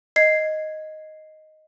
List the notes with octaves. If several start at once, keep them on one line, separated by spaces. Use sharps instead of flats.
D#5 G#6 C7